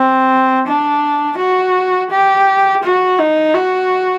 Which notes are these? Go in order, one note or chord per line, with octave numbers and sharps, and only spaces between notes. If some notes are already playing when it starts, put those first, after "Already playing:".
Already playing: C4
D4
F#4
G4
F#4
D#4
F#4